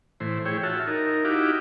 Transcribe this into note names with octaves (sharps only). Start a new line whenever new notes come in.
A2 E3 C5
E4 G#4 C#5 G5
F4 F#4 E5 A5
D#4 A#4
D#4 E4 F#4 G4 F5 D6